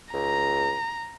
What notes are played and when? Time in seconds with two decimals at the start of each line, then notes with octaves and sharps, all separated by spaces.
0.14 C#2 A#5